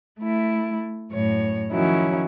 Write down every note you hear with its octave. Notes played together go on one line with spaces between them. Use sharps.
A3 E4
F#2 A2 C#5
D#3 F3 F#3 C#4 E4